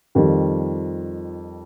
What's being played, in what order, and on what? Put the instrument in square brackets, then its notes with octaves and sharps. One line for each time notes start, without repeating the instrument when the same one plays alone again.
[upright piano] F2 D#3 G3 F4